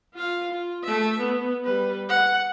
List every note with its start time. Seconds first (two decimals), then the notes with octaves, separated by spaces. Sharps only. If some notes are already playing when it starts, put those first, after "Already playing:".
0.14 F4 F5
0.50 F4
0.83 A3 E5
1.19 B3
1.64 G3 B4
2.09 F#5